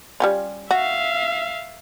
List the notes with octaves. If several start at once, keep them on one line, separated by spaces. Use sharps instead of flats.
G3 C#4 F4
F#4 E5 F5